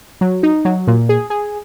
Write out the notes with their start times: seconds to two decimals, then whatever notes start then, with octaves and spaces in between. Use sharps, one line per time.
0.21 F#3
0.43 D#4
0.65 F#3
0.87 A#2
1.09 G#4
1.30 G#4